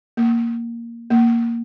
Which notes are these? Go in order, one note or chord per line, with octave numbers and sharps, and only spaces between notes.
A#3
A#3